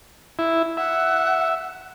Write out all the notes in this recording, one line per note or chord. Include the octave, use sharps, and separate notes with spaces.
E4
E5 F#5